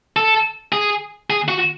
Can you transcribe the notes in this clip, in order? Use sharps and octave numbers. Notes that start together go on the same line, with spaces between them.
A4
G#4
G#4
F#4